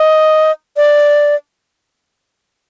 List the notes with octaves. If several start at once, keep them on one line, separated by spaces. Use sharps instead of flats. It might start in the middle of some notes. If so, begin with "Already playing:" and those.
Already playing: D#5
D5